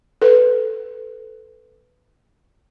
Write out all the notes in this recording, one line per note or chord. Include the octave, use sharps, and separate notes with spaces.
A4 B4